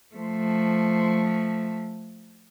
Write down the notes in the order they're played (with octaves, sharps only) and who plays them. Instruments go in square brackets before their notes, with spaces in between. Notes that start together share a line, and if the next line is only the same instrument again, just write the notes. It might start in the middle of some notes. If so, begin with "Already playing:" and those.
[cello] F3 A3